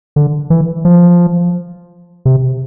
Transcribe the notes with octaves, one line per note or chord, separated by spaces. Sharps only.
D3
E3
F3
C3